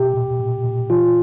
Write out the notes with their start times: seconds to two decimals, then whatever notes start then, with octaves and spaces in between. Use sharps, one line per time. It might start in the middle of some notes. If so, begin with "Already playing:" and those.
Already playing: B2 G4
0.14 A#2
0.39 A#2
0.64 A#2
0.90 E3 F4